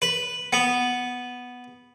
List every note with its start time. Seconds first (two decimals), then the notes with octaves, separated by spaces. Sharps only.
0.02 B4
0.53 B3